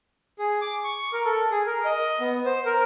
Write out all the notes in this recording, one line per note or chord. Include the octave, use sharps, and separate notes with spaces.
G#4
D6
C#6
A#4
A4
G#4
A#4
D#5
B3
C5
A#4